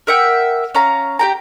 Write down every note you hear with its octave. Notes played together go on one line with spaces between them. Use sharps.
A#4 E5 F#5 G5
C#4 F5 A#5
G4 G5 A#5